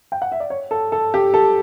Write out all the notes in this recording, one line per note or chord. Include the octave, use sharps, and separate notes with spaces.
G5
F#5
E5
D5
C#5
A4
A4
G4
A4